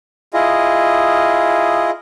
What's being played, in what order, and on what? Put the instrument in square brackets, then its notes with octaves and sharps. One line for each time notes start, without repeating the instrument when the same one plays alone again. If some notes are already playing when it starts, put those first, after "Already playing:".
[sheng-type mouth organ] E4 F4 G#4 D#5